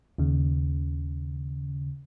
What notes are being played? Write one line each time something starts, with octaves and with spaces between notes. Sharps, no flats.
D#2 C#3